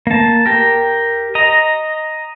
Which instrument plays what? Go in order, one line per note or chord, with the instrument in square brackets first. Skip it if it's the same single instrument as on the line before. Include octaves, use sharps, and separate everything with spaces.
[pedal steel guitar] A#3 A5
G4 A#4
D#5 A#5